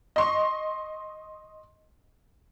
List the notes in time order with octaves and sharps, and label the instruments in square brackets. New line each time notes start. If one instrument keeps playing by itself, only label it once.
[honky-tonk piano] D#5 C6 C#6